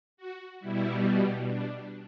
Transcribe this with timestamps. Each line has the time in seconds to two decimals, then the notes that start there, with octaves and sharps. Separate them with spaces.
0.17 F#4
0.60 B2 G3 E4
1.47 D4